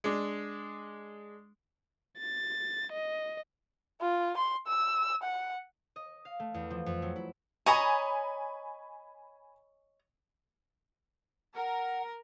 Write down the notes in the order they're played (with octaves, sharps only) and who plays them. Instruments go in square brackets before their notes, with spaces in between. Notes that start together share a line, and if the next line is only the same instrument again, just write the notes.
[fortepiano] G#3 D4
[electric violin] A6
D#5
[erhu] F4
C6
E6
F#5
[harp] D#5
F5
A3
E2
F3
F2
F#3
E4
[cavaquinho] C#5 D#5 A#5 [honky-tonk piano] G#5 B5
[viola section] A#4 [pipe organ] F#5